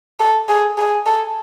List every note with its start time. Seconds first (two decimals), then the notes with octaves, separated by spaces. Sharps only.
0.19 A4
0.48 G#4
0.77 G#4
1.06 A4